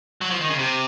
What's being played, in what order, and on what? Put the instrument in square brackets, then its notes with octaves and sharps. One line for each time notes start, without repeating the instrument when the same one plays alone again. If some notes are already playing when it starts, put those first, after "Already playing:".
[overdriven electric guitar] F#3
F3
D#3
C#3
C3